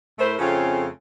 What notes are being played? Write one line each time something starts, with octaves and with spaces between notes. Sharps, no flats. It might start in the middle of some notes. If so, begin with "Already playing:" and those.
A2 A3 E4 A#4 C5
F2 C#3 A3 C4 C#4 F4